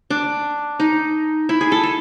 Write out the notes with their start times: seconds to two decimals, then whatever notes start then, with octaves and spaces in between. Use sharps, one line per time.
0.10 D4
0.80 D#4
1.49 E4
1.61 G#4
1.72 A4
1.83 A4